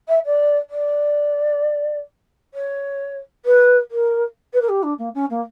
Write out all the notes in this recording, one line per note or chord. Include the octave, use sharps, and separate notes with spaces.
E5
D5
D5
C#5
B4
A#4
B4
A#4
G4
D4
A#3
C#4
A#3